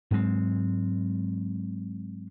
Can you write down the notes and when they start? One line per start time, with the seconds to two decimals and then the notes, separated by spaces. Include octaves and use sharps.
0.11 G#2 F#3 G#3 C4